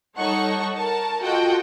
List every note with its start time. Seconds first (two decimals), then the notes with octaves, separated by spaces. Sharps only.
0.18 G3 D#4 A4 C#5 F#5 C#6
0.76 A#4 A5
1.23 F4 F#4 A4 D#5 F#5 G5